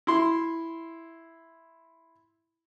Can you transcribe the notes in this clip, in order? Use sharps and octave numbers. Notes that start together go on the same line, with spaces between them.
E4 C6